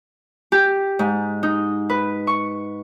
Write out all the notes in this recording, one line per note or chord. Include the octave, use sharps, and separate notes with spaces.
G4
G#2
D#4
B4
C#6